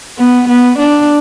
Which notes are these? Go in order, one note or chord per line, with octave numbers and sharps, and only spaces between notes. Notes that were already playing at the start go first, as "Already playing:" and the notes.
B3
B3
D4